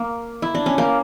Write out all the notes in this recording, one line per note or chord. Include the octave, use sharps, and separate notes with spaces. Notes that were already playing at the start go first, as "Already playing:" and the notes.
Already playing: A#3
E4
D4
C#4
A#3